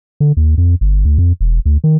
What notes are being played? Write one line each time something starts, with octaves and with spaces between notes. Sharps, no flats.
D3
D#2
F2
G1
D2
F2
E1
D2
D#3